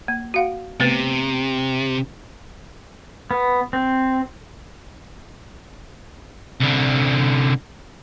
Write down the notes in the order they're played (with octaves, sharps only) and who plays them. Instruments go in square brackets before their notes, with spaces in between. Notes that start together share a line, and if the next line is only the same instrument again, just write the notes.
[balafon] A#3
F#4 F5 F#5
[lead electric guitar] C3 [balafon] A3 B3 B4
[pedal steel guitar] B3
C4
[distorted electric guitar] C2 D3